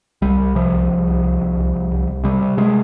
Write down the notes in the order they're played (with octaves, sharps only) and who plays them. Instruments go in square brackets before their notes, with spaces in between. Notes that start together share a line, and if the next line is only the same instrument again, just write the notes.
[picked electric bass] C2 G3
C2
C3 F3
C2
C2
C2
C2
C2
C2
C2
C2
C2
C3 G3
C3
C3 G#3